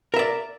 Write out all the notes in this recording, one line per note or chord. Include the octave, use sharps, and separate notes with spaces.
A#4 D5 E5